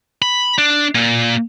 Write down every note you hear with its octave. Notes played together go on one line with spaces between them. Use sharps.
B5
D4
A#2